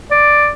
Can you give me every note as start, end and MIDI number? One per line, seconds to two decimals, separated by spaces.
0.11 0.52 74